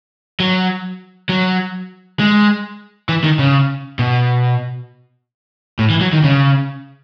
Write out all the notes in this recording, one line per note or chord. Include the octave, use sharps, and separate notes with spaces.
F#3
F#3
G#3
E3
D#3
C#3
B2
A2
E3
F#3
D#3
C#3